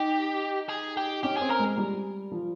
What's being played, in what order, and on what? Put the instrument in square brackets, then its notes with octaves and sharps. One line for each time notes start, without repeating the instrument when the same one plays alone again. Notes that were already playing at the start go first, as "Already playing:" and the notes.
Already playing: [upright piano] D#4 [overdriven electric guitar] G4
[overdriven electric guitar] G#4
G4
[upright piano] C#4 [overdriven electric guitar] G4
[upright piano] C4 [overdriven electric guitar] G#4
[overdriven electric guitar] A#4
[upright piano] G#3
G3
F3